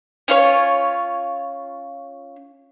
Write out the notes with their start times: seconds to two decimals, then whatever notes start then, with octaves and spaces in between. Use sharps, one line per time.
0.28 C#4 F4 C#5